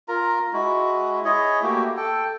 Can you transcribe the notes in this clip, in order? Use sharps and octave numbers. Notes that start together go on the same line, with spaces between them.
F4 A#4 A#5
G#3 E4 F#4
E4 G#4 C#5 D#5
A3 A#3 F#4 G4
A4 G5